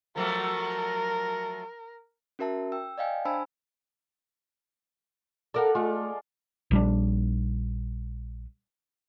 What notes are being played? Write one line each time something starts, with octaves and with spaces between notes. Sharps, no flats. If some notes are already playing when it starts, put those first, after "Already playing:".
F3 F#3 A3 A#4
C#4 F#4 A#4 E5 A5
G5 E6
D5 D#5 F5 G5 G#5
D4 C5 G#5 A5 B5 E6
A4 A#4 D5 F5 F#5
G#3 A3 F4
A#1 G3 D4